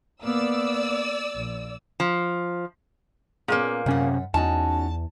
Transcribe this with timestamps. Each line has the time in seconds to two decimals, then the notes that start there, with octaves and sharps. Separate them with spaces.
0.23 A#3 B3 D5 E6
1.35 A#1
2.00 F3
3.48 A#2 A#3 B3 C#4 G#4
3.86 F#2 C3 C#4 F#5
4.34 E2 C#4 D#4 F#4 A5